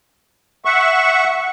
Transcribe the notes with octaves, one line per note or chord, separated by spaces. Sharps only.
E5 F#5 C#6